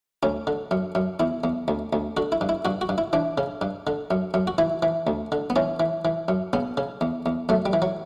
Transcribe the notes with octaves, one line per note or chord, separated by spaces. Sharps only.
D2 C#4
D3
F#2
F#2
E2 E4
E2
D2
D2
D3 F#4
E4
G2
E4
G2 F#4
F#4
G2
E4
E3 D4
C#3
G2
D3
F#2
F#2
F#4
E3 E4
E3
D2
D3
B3
E3 C#4
E3
E3
F#2
C#3 B3
C#3
E2
E2
F#2 A3
G3
E3
F#3